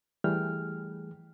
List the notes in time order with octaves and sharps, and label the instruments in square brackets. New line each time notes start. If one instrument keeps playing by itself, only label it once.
[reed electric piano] E3 G3 A3 G#4 G5 F6